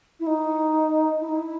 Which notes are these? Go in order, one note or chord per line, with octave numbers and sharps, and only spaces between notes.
E4
D#4
E4
D#4
E4